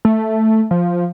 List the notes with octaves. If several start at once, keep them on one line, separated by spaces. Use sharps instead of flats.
A3
F3